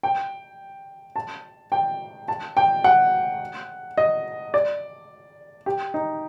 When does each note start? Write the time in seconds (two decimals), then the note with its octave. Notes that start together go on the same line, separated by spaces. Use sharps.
0.03 G5
1.16 A5
1.72 G5
2.28 A5
2.57 G5
2.84 F#5
3.97 D#5
4.54 D5
5.66 G4
5.94 D#4